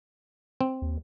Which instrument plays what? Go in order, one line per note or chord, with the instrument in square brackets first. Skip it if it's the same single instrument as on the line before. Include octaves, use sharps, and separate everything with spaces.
[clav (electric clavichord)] C4
[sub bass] D#2